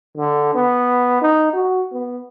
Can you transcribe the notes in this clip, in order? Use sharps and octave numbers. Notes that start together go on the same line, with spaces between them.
D3
B3
D#4
F#4
B3